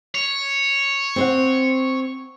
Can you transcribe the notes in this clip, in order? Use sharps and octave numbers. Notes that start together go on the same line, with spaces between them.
C#5
C4 C5 F#5